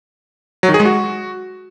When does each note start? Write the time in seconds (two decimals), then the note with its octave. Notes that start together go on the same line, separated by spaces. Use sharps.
0.63 F#3
0.69 D#3
0.74 G#4
0.80 G#3
0.85 F#4